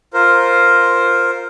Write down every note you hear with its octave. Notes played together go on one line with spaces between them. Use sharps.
F4 A#4 C5